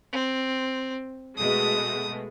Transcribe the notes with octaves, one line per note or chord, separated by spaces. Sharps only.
C4
B2 G#3 A3 D#6